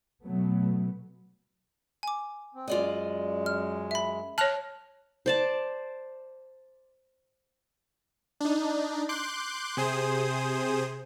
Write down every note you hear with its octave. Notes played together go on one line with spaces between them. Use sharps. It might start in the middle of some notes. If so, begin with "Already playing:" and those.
B2 F#3 A3 B3
G#5 D6
C4
F#2 G#3 F4 D5 D#5
F6
E5 B5
C#5 A5 F6 F#6 F7
C5 D5 A5
D4 D#4
C6 D6 F#6 G6
C3 G#4 C5 D#6